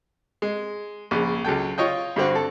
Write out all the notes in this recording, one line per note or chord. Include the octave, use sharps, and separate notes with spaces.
G#3
A#1 C#3
C#2 F#3 A4 G5
F4 C#5 D#5 G5
G2 D3 C4 F#4
A4